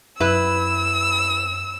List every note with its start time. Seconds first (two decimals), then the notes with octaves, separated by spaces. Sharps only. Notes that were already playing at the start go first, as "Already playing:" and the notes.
0.20 F#2 E4 B4 E6